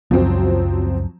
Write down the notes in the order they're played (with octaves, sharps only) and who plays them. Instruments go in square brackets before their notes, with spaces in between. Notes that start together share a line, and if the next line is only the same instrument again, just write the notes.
[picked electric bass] C#2 F#2 [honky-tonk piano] F3 F#3 C4